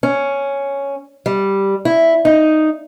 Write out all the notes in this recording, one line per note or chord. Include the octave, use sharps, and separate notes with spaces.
C#4
G3
E4
D#4